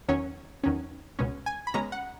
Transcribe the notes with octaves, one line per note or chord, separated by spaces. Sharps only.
E2 D#3 F#3 C#4 C#5
E2 D#3 F#3 C#4
C#2 B2 G#3 C#4
G#5
B5
C#2 B2 G#3 C#4 A#5
F#5